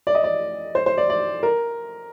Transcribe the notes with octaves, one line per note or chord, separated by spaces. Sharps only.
D5
D#5
D5
C5
C5
D5
D5
A#4